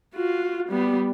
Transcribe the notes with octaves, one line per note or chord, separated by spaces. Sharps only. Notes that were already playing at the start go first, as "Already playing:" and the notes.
F4 F#4
G3 B3